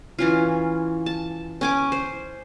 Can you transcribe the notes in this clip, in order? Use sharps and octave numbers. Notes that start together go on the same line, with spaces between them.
E3 C#4 F4
A5
C#4 G#5 D6
C5